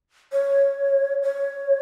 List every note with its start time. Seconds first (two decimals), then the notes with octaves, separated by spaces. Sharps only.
0.33 C#5
1.23 C#5